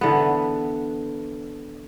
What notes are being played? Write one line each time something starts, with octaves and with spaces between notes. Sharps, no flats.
D3 E3 B3